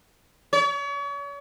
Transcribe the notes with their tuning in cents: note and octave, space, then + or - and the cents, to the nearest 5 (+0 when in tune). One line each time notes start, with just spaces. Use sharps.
C#5 +40